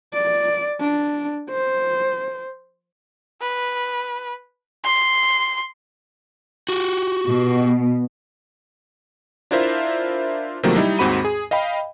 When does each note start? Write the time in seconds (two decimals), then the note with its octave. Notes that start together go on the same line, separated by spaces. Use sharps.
0.13 D5
0.80 D4
1.50 C5
3.41 B4
4.84 C6
6.69 F#4 G4
7.28 B2
9.51 D4 E4 F4 A#4 C5 E5
10.63 C3 D#3 F3 F#3 A3 A#3
10.77 G3 D#4 E4
10.99 D#2 G#2 C4 F#4 B5 D#7
11.25 G#4
11.51 D#5 F5 G5 B5